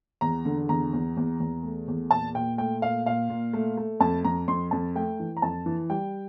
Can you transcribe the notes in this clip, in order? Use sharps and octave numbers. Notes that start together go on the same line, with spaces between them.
E2 A#5
D3
E2 A#5
E2
E2
E2
A3
E2
A#2 A5
A#2 G5
A3 G5
A#2 F5
A#2 F5
A#2
A3
A3
F2 A5
F2 A#5
F2 C6
F2 A5
A3 G5
E3
A#5
F2 A5
E3
G3 G5